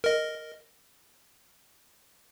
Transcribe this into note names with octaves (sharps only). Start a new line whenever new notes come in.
A#4 D#5